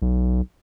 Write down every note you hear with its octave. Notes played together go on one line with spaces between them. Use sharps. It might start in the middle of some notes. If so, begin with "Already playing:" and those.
B1